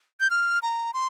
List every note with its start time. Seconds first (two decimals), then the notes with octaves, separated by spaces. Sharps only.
0.20 G6
0.30 F6
0.62 A#5
0.94 C6